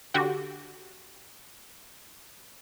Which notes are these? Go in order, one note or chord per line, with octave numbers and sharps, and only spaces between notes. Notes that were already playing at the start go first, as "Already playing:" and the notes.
D3 F#4 G4